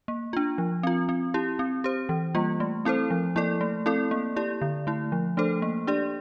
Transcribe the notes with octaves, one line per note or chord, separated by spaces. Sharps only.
A#3
D4 F4
F3
C4 F4
C4
E4 G4
C4
G4 C5
E3
G3 A#3 F4
A3
C4 E4 A4 C5
F3
A#3 E4 A4 D5
A3
C4 E4 A4 D5
A#3
E4 G4 D5
D3
A3 E4
F3
A3 D4 A4 C5
A#3
D4 G4 D5